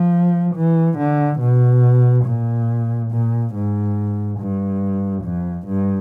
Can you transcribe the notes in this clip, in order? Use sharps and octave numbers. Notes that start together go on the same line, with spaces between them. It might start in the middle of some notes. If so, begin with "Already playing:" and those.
Already playing: F3
E3
D3
B2
A#2
A#2
G#2
G2
F2
G2